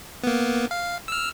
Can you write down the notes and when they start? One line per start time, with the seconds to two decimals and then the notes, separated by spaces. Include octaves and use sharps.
0.23 A#3 B3
0.71 F5
1.08 E6 F6